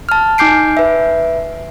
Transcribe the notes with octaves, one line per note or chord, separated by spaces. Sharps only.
A5 F6
D#4 G#5 D6 G6 C7 D7
B4 E5